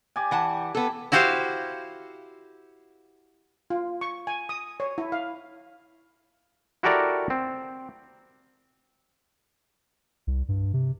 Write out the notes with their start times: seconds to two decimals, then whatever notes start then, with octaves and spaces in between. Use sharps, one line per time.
0.16 G4 D5 G#5
0.31 E3 F#5 A5
0.75 B3 A4
1.12 E4 F#4 G4 C5 F5
3.70 F4
4.01 C#6
4.27 G#5
4.49 D#6
4.80 C#5
4.98 E4
5.12 F5
6.83 E4 F#4 G4 A4 A#4 D5
7.30 C4
10.27 C2
10.49 G2
10.74 C3